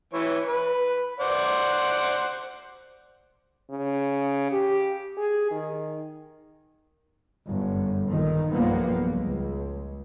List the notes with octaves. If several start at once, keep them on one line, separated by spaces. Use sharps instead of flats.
E3 C#5
B4
C5 D5 F#5
C#3
G4
G#4
D#3
G1 F#2
A#1 A#2 D#3
B1 G2 F3 G3 A#3 B3
C#2